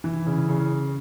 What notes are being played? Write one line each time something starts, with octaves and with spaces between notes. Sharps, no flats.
E3
C#3
C#3